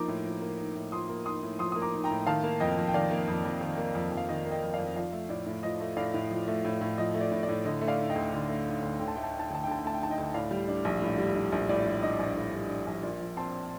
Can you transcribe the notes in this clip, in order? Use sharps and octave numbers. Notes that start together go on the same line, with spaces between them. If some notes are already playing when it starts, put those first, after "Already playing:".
Already playing: F3 A#3 D#4 A#5 D6
A2
F3
A#3
D#4
A2
F3 C6 D#6
A#3
D#4 C6 D#6
A2
F3 C6 D#6
A#3 D#6
A#5 D6
D#4
G5 A#5
A2
D#3 F5 A5
A#3
F2 D#5 G5
F2
G5
D#3 D5 F5
A#3
F2
F2
D#3
A#3
F2
F2
F5
D#3 D#5
A#3
D#5 G5
F2
D5 F5
F2
F3 D5 F5
A3
A2 D5
A2
F3 D#5
A3
A2 D5 F5
A2
F3
A3
A2
A2
F3 D#5
A3
D5
A2
D5
A2
D3 D#5
A3
D5 F5
D#4
D#5 G5
D2
D3
A3
D#4
D2
D3 G5
A5
A3 G5
A5
D#4 G5
A5
G5
D2 A5
G5
D3 A5
G5
A3 A5
G5
D#4 A5
D#5 G5
D2
A2 D5 F5
G3
D4
A#1
A2
G3
D4
A#1
A2 D5
G3
D4 D#5
A#1
A2
G3
D4
A#1
A#2 D5
F3
C4 A5 C6